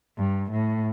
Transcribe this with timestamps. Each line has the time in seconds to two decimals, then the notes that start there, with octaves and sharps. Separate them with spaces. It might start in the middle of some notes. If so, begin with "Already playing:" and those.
0.18 G2
0.52 A2